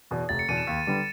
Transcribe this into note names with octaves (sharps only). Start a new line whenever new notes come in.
E2 B2
F1 A6
C#7
E2 B2 D#7
E7
D#2
D3 G3 B3